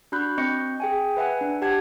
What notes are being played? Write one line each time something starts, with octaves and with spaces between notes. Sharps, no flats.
D4 F#4 B5 F#6 G6
C4 D#5 C#6 G6 C#7
G#4 G5 G#5
B4 E5 F#5 G#5
D4
G4 F#5 A5 G#6